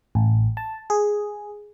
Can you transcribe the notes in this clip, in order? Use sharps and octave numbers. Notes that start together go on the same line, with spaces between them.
A1
A5
G#4